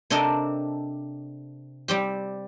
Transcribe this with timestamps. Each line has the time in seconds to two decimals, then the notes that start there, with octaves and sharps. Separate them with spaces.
0.10 C3 C4 D4 A4 A#4 D#5
1.88 G3 C4 G4